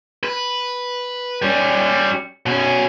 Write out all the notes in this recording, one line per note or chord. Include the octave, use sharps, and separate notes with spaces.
B4
G3 C#4
B2 C#4